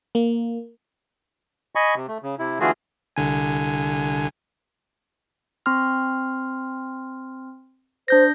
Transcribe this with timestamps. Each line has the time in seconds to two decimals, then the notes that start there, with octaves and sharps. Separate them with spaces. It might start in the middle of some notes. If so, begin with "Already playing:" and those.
0.15 A#3
1.75 D#5 G#5 B5 C#6
1.96 C3
2.08 A3
2.23 C#3
2.39 C3 E4
2.60 D3 E3 A3 F4 F#4 G#4
3.17 C2 D3 G#5
5.66 C4 C6 F6
8.08 D4 C5 G6 A#6